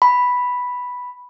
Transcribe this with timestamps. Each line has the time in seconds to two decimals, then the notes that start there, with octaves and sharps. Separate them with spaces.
0.02 B5